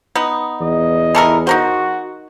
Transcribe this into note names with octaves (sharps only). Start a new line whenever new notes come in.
B3 D#4
E2 D#5
E3 A4 A#4
D#4 F#4 A#4 C5